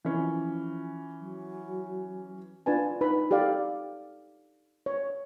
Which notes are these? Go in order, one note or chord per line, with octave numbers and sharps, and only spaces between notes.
E3 F3 C#4
F#3
D4 F4 B4 G#5 A5
D#4 B4 B5
G4 A4 D5 F5
C#5